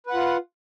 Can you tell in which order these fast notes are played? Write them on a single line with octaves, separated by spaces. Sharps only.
B4 F#5 F4